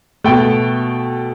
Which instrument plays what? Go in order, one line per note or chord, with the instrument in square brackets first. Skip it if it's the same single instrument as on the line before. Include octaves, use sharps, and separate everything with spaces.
[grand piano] B2 A3 G5